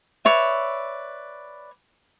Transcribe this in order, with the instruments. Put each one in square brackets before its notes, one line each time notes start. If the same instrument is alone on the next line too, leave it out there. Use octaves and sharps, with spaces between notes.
[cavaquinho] B4 C#5 D5 E5